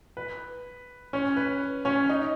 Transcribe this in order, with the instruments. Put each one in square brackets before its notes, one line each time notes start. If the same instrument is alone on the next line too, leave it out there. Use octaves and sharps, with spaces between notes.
[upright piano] B4
C#4 C#5
B4
C#4 C#5
D#4 D#5